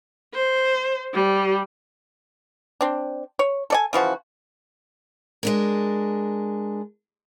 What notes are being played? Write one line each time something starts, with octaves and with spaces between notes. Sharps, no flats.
C5
G3
C4 D4
C#5
A4 D5 G#5
C#3 E3 F3 F#4
G#3 D4 A#4